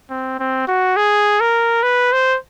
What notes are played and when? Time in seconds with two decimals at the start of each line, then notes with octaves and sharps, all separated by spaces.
0.10 C4
0.40 C4
0.68 F#4
0.97 G#4
1.41 A#4
1.83 B4
2.13 C5